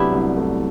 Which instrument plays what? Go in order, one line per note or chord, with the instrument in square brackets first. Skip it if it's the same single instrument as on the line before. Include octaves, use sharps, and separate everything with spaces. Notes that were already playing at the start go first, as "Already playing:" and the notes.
Already playing: [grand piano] C3 F#3 A3 [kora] B3 D4 E4 G4
[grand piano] C2
A3